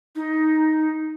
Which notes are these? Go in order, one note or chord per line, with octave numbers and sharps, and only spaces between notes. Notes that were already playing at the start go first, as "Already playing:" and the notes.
D#4